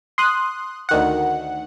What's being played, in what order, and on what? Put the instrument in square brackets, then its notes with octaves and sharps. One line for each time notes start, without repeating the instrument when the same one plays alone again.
[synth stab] C6 D#6 F#6
D2 D#3 F#5